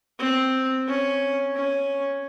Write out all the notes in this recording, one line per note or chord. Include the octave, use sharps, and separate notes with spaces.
C4
C#4
C#4